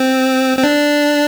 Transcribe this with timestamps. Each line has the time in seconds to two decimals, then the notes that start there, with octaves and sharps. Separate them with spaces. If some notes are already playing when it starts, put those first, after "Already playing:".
Already playing: C4
0.58 C4
0.64 D4